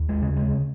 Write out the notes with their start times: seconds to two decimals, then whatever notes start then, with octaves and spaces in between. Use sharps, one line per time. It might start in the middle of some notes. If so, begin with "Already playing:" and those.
Already playing: D#2
0.09 G#3
0.22 C#3
0.37 G#3